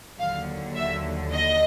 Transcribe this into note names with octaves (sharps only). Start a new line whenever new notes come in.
D#2 D3 F#3 F5
E5
D#5